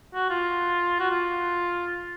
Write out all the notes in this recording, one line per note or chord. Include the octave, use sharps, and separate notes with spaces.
F#4
F4
F#4
F4